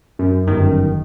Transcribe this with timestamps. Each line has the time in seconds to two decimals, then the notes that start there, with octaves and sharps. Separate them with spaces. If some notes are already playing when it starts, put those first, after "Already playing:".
0.19 F#2
0.47 G1 D#3